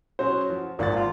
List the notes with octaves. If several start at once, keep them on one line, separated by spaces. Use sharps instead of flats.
F#3 C#4 F#4 C5
F3
G#1 A#2 F#5 A6
F4